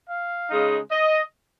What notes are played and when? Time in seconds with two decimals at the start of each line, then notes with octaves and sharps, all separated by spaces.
0.08 F5
0.49 C#3 G#3 D#4
0.91 D#5